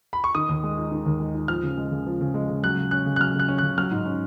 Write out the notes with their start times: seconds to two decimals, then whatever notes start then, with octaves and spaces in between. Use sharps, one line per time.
0.13 B5
0.24 C#6
0.35 D#3 D#6
0.49 D#2
0.64 G#3
0.78 D#4
0.92 D#3
1.06 D#2
1.20 G#3
1.35 D#4
1.48 F3 F6
1.63 C#3
1.77 G#3
1.92 C#3
2.06 F3
2.21 C#3
2.34 G#3
2.49 C#3
2.63 F#3 F#6
2.77 C#3
2.91 C#4 F#6
3.06 C#3
3.16 F#6
3.20 F#3 F6
3.34 C#3
3.39 F#6
3.49 C#4
3.58 C#3 F#6
3.78 F#3 F6
3.91 G#2
4.06 C#4